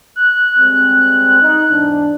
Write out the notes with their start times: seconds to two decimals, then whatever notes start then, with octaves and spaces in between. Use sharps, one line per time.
0.16 F#6
0.59 G3 G#3 C4
1.40 D#4
1.70 E2 G#2 D4